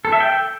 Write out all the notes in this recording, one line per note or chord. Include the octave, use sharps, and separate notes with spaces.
A4
E5
G5